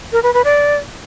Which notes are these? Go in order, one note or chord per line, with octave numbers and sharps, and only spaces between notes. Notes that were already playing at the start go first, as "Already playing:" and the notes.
A#4
B4
B4
D5